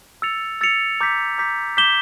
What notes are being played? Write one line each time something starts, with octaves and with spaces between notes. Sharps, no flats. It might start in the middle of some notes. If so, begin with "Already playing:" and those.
E6 A6 C#7 F7
E6 A6 C#7 F7
A#5 D6 G6 B6
A#5 D6 G6 B6
D6 G6 B6 E7 G7